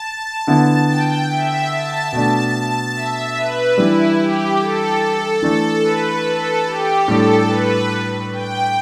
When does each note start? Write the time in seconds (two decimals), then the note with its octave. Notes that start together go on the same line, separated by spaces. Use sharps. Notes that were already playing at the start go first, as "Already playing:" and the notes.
Already playing: A5
0.47 D3 B3 E4
0.89 G5
1.30 E5
1.71 A5
2.12 B2 A3 D4
2.95 E5
3.37 B4
3.77 E3 G3 D4 E4
4.19 G4
4.60 A4
5.42 E3 A3 D4
5.83 B4
6.25 A4
6.66 G4
7.07 A2 G3 D4 A4
7.48 B4
8.31 G5